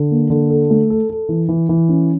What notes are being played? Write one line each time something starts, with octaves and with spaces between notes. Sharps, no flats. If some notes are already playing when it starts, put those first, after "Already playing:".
Already playing: D3
A#3
D3
A4
A3
A4
A4
E3
E3
E3
C#4